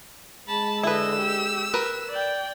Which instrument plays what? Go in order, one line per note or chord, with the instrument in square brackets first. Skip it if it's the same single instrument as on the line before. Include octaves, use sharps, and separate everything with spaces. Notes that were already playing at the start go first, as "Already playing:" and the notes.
[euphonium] G#3 [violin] A5 [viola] B5
[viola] D3 D#5 [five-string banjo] E4 B4 [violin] E6
[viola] G4
[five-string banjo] A#4 B4
[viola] D5 G5